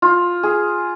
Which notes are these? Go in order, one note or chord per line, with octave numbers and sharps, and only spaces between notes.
F4
G#4